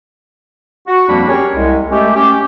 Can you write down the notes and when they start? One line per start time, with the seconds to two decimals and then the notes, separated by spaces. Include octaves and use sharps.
0.87 F#4
1.09 F2 F3 G3 A#3 D4 B5
1.29 C#4 G4 G#4 A#4 C#5
1.55 C2 G#3
1.91 G#3 A3 C#4 G4
2.15 C#4 G4